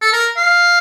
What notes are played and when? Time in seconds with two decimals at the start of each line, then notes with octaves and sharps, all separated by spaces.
0.01 A4
0.13 A#4
0.37 F5